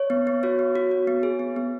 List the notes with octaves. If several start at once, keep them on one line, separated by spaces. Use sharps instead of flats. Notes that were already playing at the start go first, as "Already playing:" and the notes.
Already playing: C#5
B3
B3
F#4 C#5
B3
F#4
F#4
B3
G#4
B3
B3